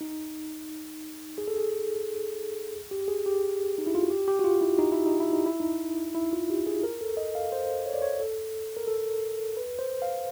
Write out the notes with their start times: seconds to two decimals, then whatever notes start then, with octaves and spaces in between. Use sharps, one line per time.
0.01 D#4
1.38 G#4
1.48 A4
1.57 G#4
2.91 G4
3.08 G#4
3.26 G4
3.78 D#4
3.87 E4
3.95 F4
4.03 F#4
4.10 G4
4.28 G4
4.39 F#4
4.44 F4
4.61 E4
4.79 D#4
4.92 E4
5.06 D#4
5.20 E4
5.33 D#4
5.46 E4
5.60 D#4
6.15 E4
6.33 F4
6.50 G4
6.66 G#4
6.83 A#4
7.01 A4
7.17 D#5
7.35 F5
7.52 C5
7.86 C#5
7.94 D5
8.02 C#5
8.20 A4
8.77 A#4
8.87 A4
9.57 B4
9.79 C5
10.02 F5